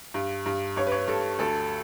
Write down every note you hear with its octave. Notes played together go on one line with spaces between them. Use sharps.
G2
G2
G2 C#5
B4
C#5
G2 A4
D2 A4